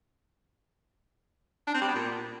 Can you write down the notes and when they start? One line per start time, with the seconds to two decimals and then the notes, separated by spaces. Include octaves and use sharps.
1.67 D4
1.74 C4
1.81 G3
1.88 B3
1.95 A#2